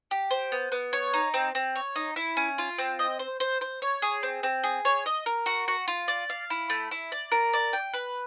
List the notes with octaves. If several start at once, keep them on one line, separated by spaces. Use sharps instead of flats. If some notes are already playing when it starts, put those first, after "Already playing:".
G4
C5
B3
B3
C#5
D#4
C4
C4
C#5
D#4
E4
C#4
F4
C4
D#5
C5
C5
C5
C#5
G#4
C4
C4
G#4
C#5
D#5
A#4
F#4
F#4
F4
D5
F5
E4
A3
E4
D5
A#4
D5
G5
B4